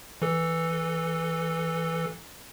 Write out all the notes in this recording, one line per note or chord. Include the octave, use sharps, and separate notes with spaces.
E3 A4